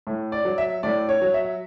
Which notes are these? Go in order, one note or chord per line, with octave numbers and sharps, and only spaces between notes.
A2
D5
F#3
E5
A2 D5
C#5
F#3
E5